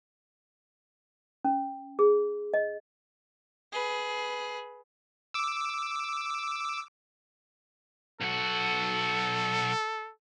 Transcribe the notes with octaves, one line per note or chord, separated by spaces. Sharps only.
C#4
G#4
D#5
G#4 B4
D6 E6
B1 F#4 A4